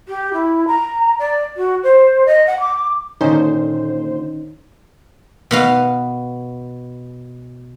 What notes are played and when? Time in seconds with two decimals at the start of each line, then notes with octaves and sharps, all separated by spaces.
0.08 G4
0.33 E4
0.67 A#5
1.19 D5
1.57 F#4
1.83 C5
2.26 D#5
2.47 F#5
2.60 D6
3.21 A#2 D3 D#3 C#4 D#4 C5
5.51 B2 B3 F5